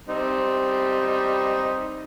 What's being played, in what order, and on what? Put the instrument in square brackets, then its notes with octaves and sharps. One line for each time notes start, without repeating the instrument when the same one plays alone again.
[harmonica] G3 C4 D#4